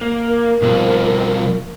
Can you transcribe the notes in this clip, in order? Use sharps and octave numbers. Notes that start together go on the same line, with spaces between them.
A#3
A#4
F2 B2 G3